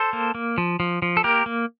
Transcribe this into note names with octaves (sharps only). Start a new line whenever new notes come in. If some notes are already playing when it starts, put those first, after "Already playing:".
Already playing: A4 C5
A#3
A#3
F3
F3
F3
A4
A#3 G4 A#4
A#3